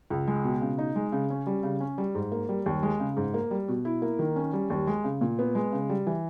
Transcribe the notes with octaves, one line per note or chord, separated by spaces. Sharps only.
C#2
G#3
B2
C#3
D#4
G#3
C#3
C#4
G3
C#3
C#4
G3
G#2
A#3
G3
D#2
G#3
C#3
G#2
A#3
G3
B2
E4
A#3
D#3
C#4
G3
D#2
G#3
C#3
A#2
B3
G#3
C#3
G3
E3